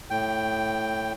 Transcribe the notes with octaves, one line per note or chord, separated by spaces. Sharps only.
A2 G5